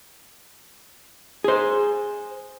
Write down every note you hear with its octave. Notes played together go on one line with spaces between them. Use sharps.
G#4 C5